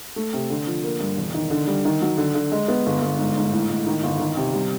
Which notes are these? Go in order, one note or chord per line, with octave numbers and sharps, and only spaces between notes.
A3
C3
D3
F3
A#3
G2
E1
D#3
D3
G3
D#3
F#3
D3
D3
G#3
B3
G1
G1
G#2
G#2
A2
A2
D#3
G1
D#3
C3
G3